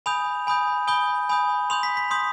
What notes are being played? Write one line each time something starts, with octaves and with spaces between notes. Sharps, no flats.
G#5 B5 D#6 G6 F7
G#5 B5 D#6 G6
G#5 B5 D#6 G6 G7
G#5 B5 D#6 G6
C6 D#6 G6 F7
B6
B6
C6 D#6 G6